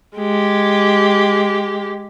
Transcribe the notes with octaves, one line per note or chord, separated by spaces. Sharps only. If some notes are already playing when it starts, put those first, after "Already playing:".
G#3 G4